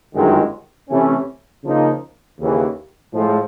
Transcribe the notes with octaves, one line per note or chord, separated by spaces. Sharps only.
G1 F#2 D#3 G#3
C3 E3 A3 C#4
C#3 F3 A#3 D#4
D#2 C#3 E3
A2 F3 G#3